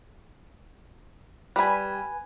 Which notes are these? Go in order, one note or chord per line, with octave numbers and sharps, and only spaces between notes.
G3 B4 G#5 B5